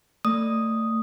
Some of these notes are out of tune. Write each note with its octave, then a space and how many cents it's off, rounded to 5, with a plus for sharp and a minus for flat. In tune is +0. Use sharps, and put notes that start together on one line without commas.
A3 +30 D5 +0 D#6 +0